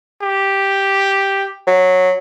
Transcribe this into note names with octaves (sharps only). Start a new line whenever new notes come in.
G4
F#3